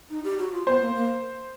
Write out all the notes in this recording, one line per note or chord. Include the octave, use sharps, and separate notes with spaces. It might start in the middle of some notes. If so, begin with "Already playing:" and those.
D#4
G4
F#4
F4
B3 C5
A#3
A#3